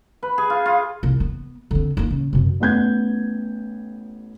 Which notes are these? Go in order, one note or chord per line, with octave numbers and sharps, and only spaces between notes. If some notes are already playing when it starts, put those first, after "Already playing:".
B4
G#4
F4
F4
C2
B3
D3 C4
D#2 B3
C#3
F#2 C3
A1 B3 G6 G#6